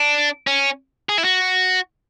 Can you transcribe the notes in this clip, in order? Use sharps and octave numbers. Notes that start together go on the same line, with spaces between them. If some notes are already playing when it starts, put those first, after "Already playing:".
Already playing: D4
C#4
G#4
E4
F#4